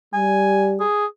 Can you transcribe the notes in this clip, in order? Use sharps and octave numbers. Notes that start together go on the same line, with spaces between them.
G3 G#5
G#4